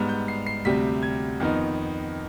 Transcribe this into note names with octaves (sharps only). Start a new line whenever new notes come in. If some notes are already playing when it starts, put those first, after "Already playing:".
Already playing: G#2 G3 B3 F6
G6
C7
C7
D2 C3 G3 B6
G#6
F2 D#3 B3 D#4